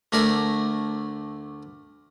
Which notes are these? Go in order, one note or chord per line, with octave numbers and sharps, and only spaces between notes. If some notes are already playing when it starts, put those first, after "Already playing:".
D2 A3 A#4 D5 G#5